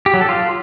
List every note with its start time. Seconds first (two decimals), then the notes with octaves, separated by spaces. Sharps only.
0.06 G4
0.14 F#3
0.21 A4
0.29 F4